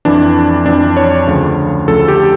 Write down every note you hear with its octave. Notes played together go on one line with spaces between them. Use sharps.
F2 E3 D4
F2 E3 D4
C#5
D2 C#3 F3
D2 C#3 F3 A4
G4